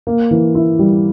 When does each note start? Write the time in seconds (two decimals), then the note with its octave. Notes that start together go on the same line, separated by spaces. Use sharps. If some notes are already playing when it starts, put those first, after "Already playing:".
0.07 A#3
0.31 E3
0.55 E4
0.79 G3